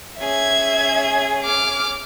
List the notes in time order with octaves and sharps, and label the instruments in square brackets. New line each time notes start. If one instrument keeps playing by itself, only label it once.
[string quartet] C#4 G#4 [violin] E5 G#6
[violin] D6 F6